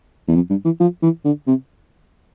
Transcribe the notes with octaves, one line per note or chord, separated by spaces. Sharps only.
E2
F2
G2
E3
F3
E3
D3
C3